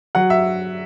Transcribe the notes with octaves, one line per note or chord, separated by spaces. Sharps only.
F#3 F#5
E5